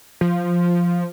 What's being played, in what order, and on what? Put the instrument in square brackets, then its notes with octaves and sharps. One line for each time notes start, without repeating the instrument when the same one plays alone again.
[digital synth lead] F3